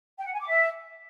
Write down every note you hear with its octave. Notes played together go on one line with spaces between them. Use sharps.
G5
F#5
G#5
D6
E5